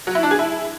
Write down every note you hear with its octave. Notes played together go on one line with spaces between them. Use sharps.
F#3
E4
D4
G#4
E4